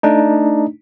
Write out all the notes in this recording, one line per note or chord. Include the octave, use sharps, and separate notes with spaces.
A3 D4 D#4